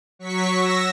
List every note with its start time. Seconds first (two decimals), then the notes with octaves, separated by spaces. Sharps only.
0.19 F#3 C#6 B6
0.54 E6 A#6